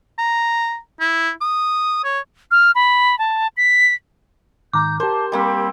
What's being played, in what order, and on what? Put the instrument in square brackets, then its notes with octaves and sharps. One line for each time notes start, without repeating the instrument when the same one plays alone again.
[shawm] A#5
E4
D#6
C#5
[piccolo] F6
B5
A5
B6
[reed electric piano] G#2 D#3 A#5 [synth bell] D6 [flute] G6
[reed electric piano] G4 A#4 [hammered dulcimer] C5 [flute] A5
[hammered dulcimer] G3 A#3 C4 [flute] B5